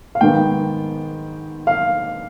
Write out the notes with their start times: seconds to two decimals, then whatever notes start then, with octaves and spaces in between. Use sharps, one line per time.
0.15 F5
0.21 G#2 D#3 B3 G5
1.67 F5